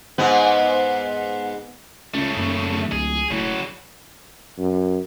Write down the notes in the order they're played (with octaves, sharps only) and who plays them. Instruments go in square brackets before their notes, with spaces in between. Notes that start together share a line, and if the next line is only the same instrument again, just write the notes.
[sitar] G#2 B3
[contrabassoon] C#2 [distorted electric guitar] C#3 A3
[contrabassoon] D#1 [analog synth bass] F#2
[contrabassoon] D1
[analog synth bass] C#2 [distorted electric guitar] G#4
[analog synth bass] E1 [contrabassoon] A2 [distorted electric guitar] C#3 F#3
[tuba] F#2